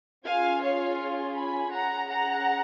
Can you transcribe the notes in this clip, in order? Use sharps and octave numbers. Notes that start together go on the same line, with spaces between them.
C#4 F4 G#4 F5 G#5
C#5 F5
G#5 B5
C#4 G#4 F#5 A#5
F#5 A#5